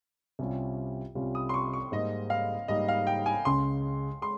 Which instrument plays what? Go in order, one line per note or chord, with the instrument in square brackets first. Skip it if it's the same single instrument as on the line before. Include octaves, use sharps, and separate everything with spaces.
[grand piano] C2 C3 G3 C#4 F4
C2 C3 G3 C#4 F4
[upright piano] D#6
C6
C#6
C#6
[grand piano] G#2 G3 A#3 D#4 [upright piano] D#5
[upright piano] F5
[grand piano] G#2 G3 A#3 D#4 [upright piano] D#5
[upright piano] F5
G5
G#5
[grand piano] C#2 C#3 G#3 [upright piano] C6
[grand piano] G#3 [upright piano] C6